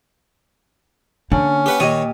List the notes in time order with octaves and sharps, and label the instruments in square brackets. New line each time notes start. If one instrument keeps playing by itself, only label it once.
[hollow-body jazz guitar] D3 [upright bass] A#3 [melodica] C#4
[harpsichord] G4 B4 F#5
[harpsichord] D#2 C#5 D#6 [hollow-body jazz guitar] A#2 G4 D#5